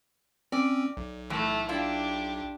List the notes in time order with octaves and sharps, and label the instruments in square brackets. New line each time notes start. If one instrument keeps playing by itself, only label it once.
[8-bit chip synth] C4 C#4 [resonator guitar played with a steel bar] D5
[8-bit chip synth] B1
[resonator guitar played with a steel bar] A2 E3 [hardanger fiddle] A3
[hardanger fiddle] D4 G4 [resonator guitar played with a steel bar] E4 F4